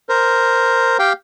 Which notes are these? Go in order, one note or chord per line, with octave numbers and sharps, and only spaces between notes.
A#4 C5
G4 F5 G5